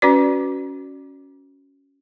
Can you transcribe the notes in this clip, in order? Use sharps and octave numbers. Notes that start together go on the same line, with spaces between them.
C#4 F#4 B4 D5